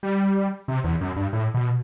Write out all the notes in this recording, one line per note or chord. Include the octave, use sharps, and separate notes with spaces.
G3
C3
E2
F#2
G2
A2
B2